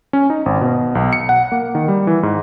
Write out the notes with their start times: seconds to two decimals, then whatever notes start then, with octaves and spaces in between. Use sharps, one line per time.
0.13 C#4
0.30 D#4
0.46 G#1
0.61 B2
0.95 B1
1.13 C#7
1.29 F#5
1.52 A#3
1.75 D#3
1.88 G3
2.07 E3
2.23 G#2